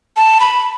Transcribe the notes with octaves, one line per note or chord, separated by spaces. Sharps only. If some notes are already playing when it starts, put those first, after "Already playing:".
A5
B5